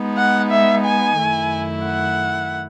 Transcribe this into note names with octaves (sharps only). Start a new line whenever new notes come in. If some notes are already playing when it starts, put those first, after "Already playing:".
Already playing: G#3 B3 D#4
F#5
E5
G#5
F#2 D#3 A3 E4
F#5